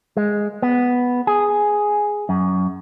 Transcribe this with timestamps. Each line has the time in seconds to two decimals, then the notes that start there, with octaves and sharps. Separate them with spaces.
0.17 G#3
0.62 B3
1.27 G#4
2.29 F#2